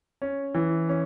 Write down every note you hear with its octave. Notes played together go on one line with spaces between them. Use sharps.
C#4
E3
C#4